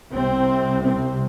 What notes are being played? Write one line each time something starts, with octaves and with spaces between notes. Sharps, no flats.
C2 C3 C4
C4